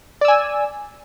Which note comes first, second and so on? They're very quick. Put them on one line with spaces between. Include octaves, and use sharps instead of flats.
D5 E6 G#5